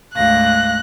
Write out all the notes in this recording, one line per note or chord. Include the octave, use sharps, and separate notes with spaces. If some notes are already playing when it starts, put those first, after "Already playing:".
D2 G#2 F5 F#6 A#6